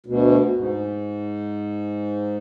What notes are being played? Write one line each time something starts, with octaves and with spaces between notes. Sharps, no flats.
D2 B2
G#2